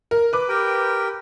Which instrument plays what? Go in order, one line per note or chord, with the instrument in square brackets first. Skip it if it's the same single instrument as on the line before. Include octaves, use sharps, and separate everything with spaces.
[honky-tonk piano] A#4
B4 D6
[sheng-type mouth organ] G4 A#4 G5